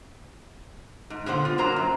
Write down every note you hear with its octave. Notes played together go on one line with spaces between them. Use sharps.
G#2
A#2 D3 B3 C5 F#5
F4
A#2 F#3 A#3 C5 A#5
F#2